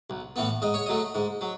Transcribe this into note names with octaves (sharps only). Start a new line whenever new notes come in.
B1
A2 E3 B3
G#2 D#5
C#5
F#3 A3 D#5
G#2
F#3